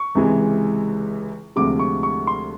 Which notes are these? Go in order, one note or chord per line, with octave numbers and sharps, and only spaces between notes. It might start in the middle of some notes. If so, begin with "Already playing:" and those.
Already playing: C#6
C#2 C3 E3 G#3
D2 C3 F3 G#3 D6
C#6
C#6
C6